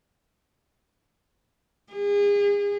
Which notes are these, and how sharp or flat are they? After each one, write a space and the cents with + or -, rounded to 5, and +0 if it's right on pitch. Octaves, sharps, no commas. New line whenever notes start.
G#4 -35